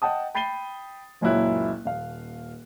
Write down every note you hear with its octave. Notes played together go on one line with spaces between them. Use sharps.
D#5 F#5 G5 A5 D#6
G5 B5 A6 C7 D#7 G7
F#1 C#2 A#2 F#3 E4 F#6
D#1 F5